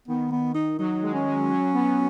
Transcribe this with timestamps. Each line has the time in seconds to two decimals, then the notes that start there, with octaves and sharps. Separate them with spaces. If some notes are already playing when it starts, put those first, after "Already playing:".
0.08 D#3 B3
0.31 B3
0.54 D#4
0.79 F#3 D#4
1.02 G#3
1.14 C#4
1.25 G#3
1.50 F#3
1.73 B3